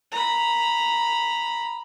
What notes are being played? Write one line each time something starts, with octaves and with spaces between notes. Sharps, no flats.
A#5 B5